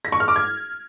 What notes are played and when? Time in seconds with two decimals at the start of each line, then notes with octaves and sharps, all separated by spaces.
0.05 A#6
0.12 C#6
0.20 F6
0.28 D6
0.36 G#6